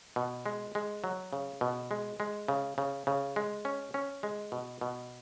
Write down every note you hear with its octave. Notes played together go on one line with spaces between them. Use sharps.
B2
G#3
G#3
F#3
C#3
B2
G#3
G#3
C#3
C#3
C#3
G#3
C#4
C#4
G#3
B2
B2